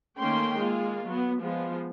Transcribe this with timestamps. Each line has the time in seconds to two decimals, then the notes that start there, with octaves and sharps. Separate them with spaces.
0.19 D#3 A3 A#3 C#4 G5 C6
0.56 G#3 A#3 F4
1.08 F#3 B3
1.39 F3 G#3 B3 F4